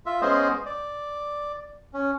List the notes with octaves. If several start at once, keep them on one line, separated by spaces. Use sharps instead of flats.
F4 E5
G#3 B3 C#4 G#4 C5 D#5
D5
C#4